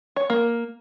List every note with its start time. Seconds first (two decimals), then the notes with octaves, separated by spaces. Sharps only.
0.16 C#5
0.30 A#3